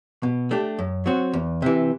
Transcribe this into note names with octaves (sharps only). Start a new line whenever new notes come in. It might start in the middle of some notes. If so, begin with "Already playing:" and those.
B2
A3 D4 G4
F#2
F#3 C4 F#4
E2
C3 E3